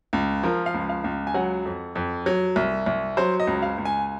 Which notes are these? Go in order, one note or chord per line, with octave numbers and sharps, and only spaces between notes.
C#2
F3 A#4
F5
C#2
F5
C#2
G#5
F#3 F#5
F2
F2
F#3
C2
C2
F#3 C5
D#5
C#2
F5
C#2
G#5